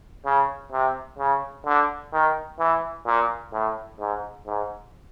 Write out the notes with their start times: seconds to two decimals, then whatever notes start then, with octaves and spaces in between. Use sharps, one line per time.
0.25 C#3
0.72 C3
1.19 C#3
1.66 D3
2.13 D#3
2.59 E3
3.06 A#2
3.53 A2
3.99 G#2
4.46 G#2